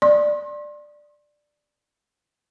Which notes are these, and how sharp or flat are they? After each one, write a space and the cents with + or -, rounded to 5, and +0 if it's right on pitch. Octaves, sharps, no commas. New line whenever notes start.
D5 +10 C6 +35